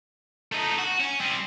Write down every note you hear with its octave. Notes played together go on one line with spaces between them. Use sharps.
A3 D#4
F#4
C#4
G3 C4